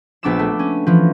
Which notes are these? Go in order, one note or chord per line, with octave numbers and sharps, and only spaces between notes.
A#1 B3 D4 D6 E6 E7
A3
C#4
E3 F3